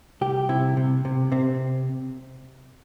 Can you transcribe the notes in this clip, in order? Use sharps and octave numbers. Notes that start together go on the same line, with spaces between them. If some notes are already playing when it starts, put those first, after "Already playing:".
C2 G4
C3 E4
C3
C3
C3 C4